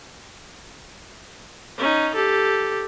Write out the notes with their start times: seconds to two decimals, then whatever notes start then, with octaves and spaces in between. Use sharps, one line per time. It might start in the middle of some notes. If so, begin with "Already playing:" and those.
1.78 C#4 D#4
2.15 G4 A4